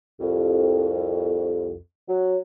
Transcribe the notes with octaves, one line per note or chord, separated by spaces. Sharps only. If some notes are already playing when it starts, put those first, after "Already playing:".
C2 F2
F#3